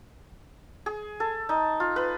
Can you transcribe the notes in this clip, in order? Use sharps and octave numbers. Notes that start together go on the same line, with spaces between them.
G#4
A4
D#4
F4
B4